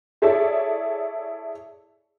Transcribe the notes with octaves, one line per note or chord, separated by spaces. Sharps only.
E4 G#4 A4 C#5 D5 E5